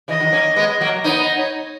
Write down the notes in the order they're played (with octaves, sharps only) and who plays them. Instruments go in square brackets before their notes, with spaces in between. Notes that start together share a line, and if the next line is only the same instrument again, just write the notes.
[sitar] C#3 E3 [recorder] D#5
[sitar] D#3 F#3
A#3 C#4
G#3 B3
F#3 A#3
[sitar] B3 D#4 [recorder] C#5
[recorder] D#5
C#5